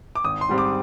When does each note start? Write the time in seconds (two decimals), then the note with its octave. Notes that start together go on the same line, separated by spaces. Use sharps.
0.15 D6
0.24 G#1 D#6
0.41 C6
0.49 G#2 G3 C4
0.58 D6